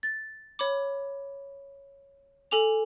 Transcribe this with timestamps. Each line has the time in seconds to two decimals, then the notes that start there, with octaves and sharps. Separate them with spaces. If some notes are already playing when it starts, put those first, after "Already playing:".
0.03 A6
0.59 C#5 B5 D6
2.51 A4 G#5 D6 F7